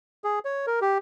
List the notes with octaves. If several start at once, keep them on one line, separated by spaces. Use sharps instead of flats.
G#4
C#5
A#4
G4